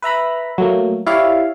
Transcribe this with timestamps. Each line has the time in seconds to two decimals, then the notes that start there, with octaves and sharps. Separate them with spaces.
0.02 B4 E5 A#5 B5
0.58 F#3 A3 A#3
1.07 E4 G4 C#5 D5 E5 F5